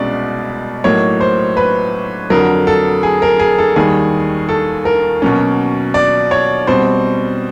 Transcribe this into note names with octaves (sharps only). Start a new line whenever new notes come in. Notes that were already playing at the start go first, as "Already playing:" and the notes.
Already playing: C2 B2 G#3 C#4 D5
A2 F#3 A#3 D#4 C#5
C5
B4
F2 D3 F#3 A#4
A4
G#4
A#4
G#4
A4
D#2 D#3 G3 G#4
A4
A#4
B2 F#3 A#3 C#4
D5
C#5
B2 G3 C4 C5